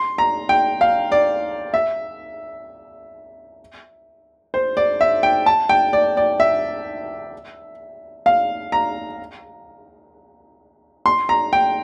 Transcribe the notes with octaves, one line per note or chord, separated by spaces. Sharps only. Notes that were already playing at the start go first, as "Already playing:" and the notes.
Already playing: C6
A#5
G5
F5
D5
E5
C5
D5
E5
G5
A5
G5
D5
D5
E5
F5
A#5
C6
A#5
G5